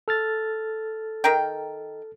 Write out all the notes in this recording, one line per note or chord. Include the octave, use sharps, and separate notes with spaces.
A4 F6 A6
D#3 A#4 G5